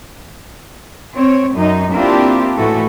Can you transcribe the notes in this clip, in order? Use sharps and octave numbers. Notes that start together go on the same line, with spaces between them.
C4 C#5
F#2 D#4
A#3 C4 D4 E4 F4 G4
A2 E3 A3 F#4 A4